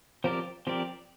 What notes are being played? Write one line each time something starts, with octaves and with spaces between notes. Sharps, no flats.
F3 C4 G4 A#4 D5
F3 C4 G4 A#4 D5